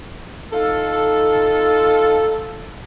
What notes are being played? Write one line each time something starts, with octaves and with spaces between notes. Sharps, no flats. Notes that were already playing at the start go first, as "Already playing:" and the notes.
D#4 F4 A4